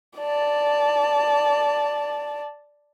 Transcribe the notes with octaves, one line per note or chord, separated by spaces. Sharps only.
D5 A5